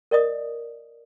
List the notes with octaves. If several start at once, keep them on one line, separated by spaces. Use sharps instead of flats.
A#4 D5 D#5 D#6